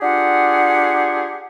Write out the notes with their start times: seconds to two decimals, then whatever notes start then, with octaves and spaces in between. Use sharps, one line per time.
0.01 D4 F4 G4 G#4 F#5